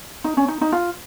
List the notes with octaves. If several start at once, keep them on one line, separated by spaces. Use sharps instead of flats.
D#4
C#4
D#4
D#4
F4